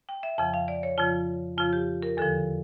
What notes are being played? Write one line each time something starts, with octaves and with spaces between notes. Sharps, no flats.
G5
E5
F2 C#3 F3 G5
F5
D5
C#5
F2 C#3 F3 F4
F2 C#3 F3 F4
G4
A#4
E2 D3 F3 A4